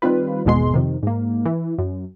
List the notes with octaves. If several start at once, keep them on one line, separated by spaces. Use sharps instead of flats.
D#3 G3 C4 F4 B4
G#1 E2 B2 G#3 C6
F2 C3 D#3
G#2 A#3
E3
F#2